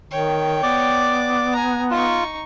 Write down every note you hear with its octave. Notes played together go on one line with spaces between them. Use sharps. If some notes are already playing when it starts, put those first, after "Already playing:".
D#3 C#5 G5
B3 D5 D6
G#5 A#5
D#4 F4 C#6